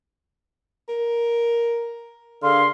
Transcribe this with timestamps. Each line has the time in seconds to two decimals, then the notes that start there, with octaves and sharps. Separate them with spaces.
0.89 A#4
2.43 D3 G#4 A#4 F5 C6